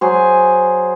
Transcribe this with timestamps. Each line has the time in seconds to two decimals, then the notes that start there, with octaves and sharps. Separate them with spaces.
0.01 F#3 G#4 C5